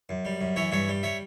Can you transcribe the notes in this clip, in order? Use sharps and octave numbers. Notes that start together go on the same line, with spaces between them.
F#2
G3
F#2
E3 C#5 E5
G2 C#5 E5
G3
C#5 E5